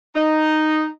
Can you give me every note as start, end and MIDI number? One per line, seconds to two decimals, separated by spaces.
0.15 0.86 63